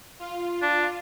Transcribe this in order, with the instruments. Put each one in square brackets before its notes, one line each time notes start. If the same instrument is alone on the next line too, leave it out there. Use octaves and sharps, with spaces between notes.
[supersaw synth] F4
[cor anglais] D4